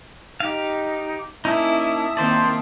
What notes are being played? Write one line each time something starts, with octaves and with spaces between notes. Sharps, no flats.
D#4 G4 F5
A#3 C#4 D#4 E4 E5 A5 D#6
D#3 A#3 C4 C5 D5